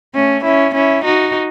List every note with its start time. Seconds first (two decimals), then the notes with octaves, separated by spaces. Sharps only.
0.14 A3 C#4
0.44 C#4 E4
0.74 C#4 E4
1.03 D#4 F#4